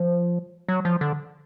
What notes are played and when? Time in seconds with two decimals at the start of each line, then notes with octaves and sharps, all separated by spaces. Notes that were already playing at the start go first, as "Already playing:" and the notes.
Already playing: F3
0.69 F#3
0.85 F3
1.01 D3